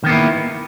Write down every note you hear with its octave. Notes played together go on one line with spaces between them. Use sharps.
D#3 A#3 B3 E4